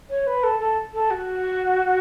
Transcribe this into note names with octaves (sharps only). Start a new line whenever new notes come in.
C#5
B4
A4
A4
A4
F#4